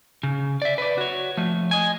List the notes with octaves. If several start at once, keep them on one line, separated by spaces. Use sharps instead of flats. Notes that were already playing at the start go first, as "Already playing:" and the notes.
C#3
D5 E5
B4 D5
F#4 C#5
F3 A3
D#5 G#5